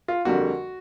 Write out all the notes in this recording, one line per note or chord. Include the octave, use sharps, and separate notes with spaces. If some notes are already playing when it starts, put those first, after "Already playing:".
F4
F2 D3 G3 A#3 F#4